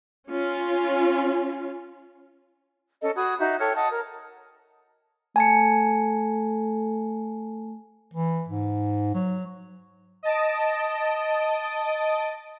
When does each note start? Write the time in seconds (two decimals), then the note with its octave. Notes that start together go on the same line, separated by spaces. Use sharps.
0.30 C#4 F4
3.01 C#4 A4 D#5
3.16 F#4 B5 D#6 G#6
3.39 D#4 F#4 E5 G6
3.59 A4 C#5 G5 F6
3.75 D#5 F#5 A5 D#6
3.90 A#4
5.36 A3 G#5 A5 C#7
8.14 E3
8.48 G#2
9.14 F#3
10.23 D#5 A5 D7